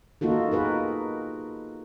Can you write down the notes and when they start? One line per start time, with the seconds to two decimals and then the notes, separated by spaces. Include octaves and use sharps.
0.21 A#3 D#4 F4 F#4 A4
0.51 G#4 A#4 B4